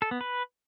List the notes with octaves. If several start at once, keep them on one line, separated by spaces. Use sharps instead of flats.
A4
B3
B4